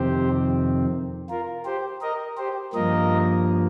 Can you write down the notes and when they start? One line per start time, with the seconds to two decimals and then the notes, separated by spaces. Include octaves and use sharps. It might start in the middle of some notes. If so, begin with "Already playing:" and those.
Already playing: F2 C3 D#3 C4 G4 C5
1.29 F4 A#4
1.65 G4 C5
2.01 A#4 D#5
2.37 G4 C5
2.73 G2 F3 A#3 A#4 D#5